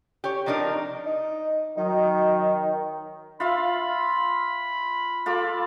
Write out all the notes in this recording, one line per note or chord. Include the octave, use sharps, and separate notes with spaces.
G4 C#5
C3 F3 D4 D#4 A#4
D#4
D#3 F#3 D#4
F4 E5 F5 B5
F4 A4 D6